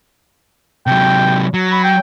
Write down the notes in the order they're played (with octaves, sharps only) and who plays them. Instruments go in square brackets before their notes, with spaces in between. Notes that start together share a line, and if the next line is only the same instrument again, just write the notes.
[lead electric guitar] C3 F#3 [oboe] G5
[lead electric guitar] F#3
[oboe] B5
G5